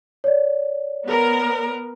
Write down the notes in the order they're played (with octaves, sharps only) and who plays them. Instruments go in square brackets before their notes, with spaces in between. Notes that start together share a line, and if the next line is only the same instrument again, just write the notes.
[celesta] C#5 D5
[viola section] B3 A#4